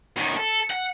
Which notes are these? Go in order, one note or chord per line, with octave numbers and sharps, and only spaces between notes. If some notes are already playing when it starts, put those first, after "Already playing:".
F#2 D#3
A4
F#5